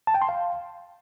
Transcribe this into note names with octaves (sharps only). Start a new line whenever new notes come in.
A5
G5
C6
F5